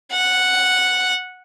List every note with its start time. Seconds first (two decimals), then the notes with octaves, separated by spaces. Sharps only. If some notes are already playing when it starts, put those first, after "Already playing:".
0.12 F#5